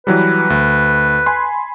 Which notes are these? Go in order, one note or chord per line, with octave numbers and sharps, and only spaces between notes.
E3 F#3 G3 B4
D2
G#5 B5 C6